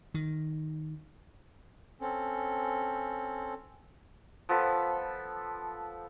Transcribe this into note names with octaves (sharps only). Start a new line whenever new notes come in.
D#3
C4 C#4 A4
F3 B3 A4 B5